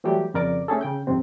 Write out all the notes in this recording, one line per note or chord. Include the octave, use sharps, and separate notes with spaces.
E3 F#3 G3 A3 G4
F2 C#3 A#4 D5 D6
A3 C#4 G#4 A4
C#3 G5 G6
C2 F2 G#2 C3 C4